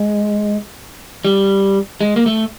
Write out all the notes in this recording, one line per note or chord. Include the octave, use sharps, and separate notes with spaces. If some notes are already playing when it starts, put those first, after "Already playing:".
Already playing: G#3
G3
G#3
A#3
A3